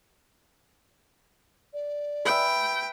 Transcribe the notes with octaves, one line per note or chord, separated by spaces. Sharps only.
D5
B4 E5 G5